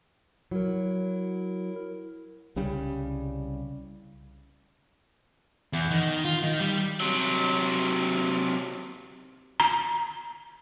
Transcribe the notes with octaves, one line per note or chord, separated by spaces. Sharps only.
F#3 E4 A#4
C2 C#3 G3
E2
D#3
F4
D#3 D#4
G3
C3 F#3
A#5